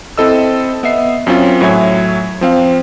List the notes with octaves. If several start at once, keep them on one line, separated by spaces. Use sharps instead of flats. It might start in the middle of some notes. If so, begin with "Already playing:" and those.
C4 E4 A4 D#5 E6
B3 D#5 E5 C7
F#2 C4 C#4 F4
A2 F#3 C#5 E5 G#5 G#6
F3 C4 F5